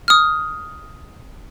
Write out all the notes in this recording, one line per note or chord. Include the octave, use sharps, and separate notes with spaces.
D#6 F6